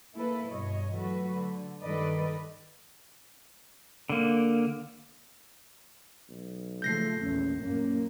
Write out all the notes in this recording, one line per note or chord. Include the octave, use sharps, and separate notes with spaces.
A#3 E4 A4 B4
G2 B2 C#5 D#5
E3 F#3 A3 F#4 A4 B4
D3
G2 D#3 A4 B4 D5 D#5
D3 A#3
B1
C#3 F3 A3 G6 A#6 C7
A#1 E2 C#4
F#2 A#2 A#3 C#4